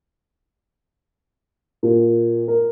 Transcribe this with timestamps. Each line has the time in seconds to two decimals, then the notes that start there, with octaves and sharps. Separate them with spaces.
1.83 A#2
2.48 A#4